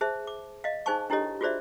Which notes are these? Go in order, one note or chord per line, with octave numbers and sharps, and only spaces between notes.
G#4 C5 E5 A5
D6
D#5 F5
D#4 G#4 C5 G#5 A5 C#6
D4 E4 G4 A4 C#5 D#5
F4 F#4 G#4 C5 D5 E5